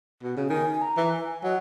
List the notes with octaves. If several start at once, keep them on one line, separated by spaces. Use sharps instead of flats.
B2
C#3
D#3 G#5
A#5
E3
G#5
F#3 D#5